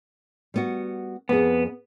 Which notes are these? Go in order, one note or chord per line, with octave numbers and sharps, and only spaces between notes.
G3 B3 F#4
F2 B3 G#4